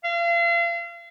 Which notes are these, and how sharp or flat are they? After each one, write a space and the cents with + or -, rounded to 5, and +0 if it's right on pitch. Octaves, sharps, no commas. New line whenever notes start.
F5 -35